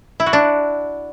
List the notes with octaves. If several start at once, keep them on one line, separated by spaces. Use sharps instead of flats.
E4
F#4
D4